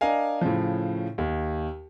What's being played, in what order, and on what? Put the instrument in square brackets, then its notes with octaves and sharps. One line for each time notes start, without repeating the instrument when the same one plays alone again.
[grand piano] D4 A#4 D#5 F5 G#5
A2 C#3 F3
D#2